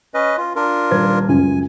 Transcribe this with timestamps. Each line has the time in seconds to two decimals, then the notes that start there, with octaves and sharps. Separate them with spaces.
0.14 C#4 B4 D#5
0.37 F4
0.56 D4 F4 A#4
0.91 D#1 B4 G#6
1.29 C#2 F#2 C#3 G#5